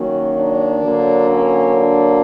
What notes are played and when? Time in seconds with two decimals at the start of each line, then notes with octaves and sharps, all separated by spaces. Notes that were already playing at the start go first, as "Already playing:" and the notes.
Already playing: D#3 F#3 A#3 C#4
0.35 D4
0.82 D3 F#3 A#3
1.29 C#4
1.75 D4